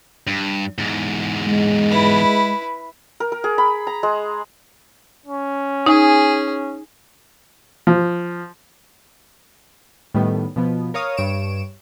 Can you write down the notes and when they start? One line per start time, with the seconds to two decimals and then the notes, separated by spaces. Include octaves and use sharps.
0.27 G2
0.78 E2 G#2
1.45 G#3
1.90 E4 B4
3.20 A#4
3.32 A#4
3.44 G#4
3.58 B5
3.87 A#5
4.03 G#3
5.26 C#4
5.86 D#4 G#4
7.87 F3
10.14 A2 D#3 G3 B3
10.56 B2 F3 B3
10.94 A#4 C#5 F5 D#6
11.17 G2 C#5 D7 E7